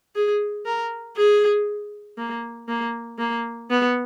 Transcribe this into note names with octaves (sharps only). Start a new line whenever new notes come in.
G#4
A#4
G#4
A#3
A#3
A#3
B3